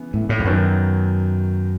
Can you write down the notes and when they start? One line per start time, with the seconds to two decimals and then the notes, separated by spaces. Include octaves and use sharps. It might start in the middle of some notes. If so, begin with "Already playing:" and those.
Already playing: C#3 E3 B3
0.14 A2
0.29 A2
0.39 E2
0.45 F#2 D#3 F#3 B3